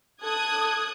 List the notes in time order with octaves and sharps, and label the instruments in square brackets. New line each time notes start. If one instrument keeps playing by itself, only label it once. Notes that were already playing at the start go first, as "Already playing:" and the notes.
[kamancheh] A4 [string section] D#6 F#6 G#6